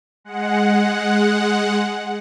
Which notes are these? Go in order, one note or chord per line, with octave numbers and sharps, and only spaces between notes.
G#3 F#5